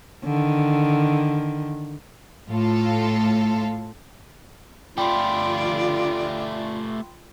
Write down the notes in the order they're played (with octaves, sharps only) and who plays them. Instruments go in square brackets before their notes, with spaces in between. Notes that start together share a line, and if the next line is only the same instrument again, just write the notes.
[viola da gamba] D3 D#3
[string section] A2 F4 A4
[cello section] D3 F4 [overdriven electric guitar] A3 G4 [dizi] D5 [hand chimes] G5 B5 C6